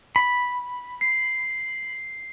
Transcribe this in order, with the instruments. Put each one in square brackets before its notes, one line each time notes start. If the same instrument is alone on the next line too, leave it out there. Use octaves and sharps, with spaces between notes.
[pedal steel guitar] B5
[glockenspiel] C7